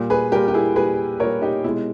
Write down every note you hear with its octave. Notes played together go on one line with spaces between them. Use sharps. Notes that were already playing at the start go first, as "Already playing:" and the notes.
Already playing: A#2 G3
G#4 B4
A#2 G3 G4 A#4
G4
E4 G#4
A#2 G3 G#4 B4
A#2 G3 A#4 C#5
D#4 G4
B2 G#3 E4